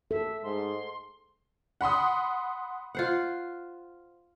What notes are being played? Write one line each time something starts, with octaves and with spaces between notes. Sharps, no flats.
A4 E5
G#2 C6
F#5 B5 C6 D#6
F4 C5 F#5